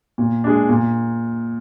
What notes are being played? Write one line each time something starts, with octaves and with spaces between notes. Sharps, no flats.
A#2
G#3 D4
A#2